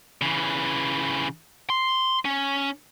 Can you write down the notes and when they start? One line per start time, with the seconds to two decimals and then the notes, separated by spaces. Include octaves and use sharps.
0.22 C#3 E3
1.70 C6
2.25 C#4